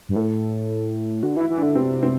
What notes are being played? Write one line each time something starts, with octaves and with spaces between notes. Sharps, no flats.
G2
A2 A4
D3 F#4
E3 E4
E3
D3 D4
C3 C4
C4